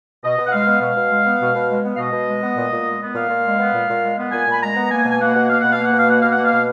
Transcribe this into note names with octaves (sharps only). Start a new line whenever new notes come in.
B2 D#5
B2
F#5
G#3 F5
B3
B2 F5
B2
G#3
B3
B2
B2
G#3
B3
F5
B2 D#5
B2
G#3
B3
A#2
A#2
G#3
B3
A#2 F5
A#2
G#3
B3
A#2
A#2
G#3
B3
A#2 G#5
A#2 B5
G#3 A#5
B3
A#3 G#5
B2
G#5
A#3 F#5
B2
A#3 F5
B2 F#5
F5
A#3
F#5
B2 F5
A#3 F#5
B2 F5
F#5
A#3
F5
B2